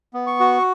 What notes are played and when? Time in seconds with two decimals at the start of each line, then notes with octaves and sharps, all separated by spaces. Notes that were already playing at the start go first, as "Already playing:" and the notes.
0.13 B3
0.27 C#6
0.40 F#4